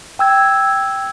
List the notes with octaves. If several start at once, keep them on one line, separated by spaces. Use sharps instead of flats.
G5 E6 G#6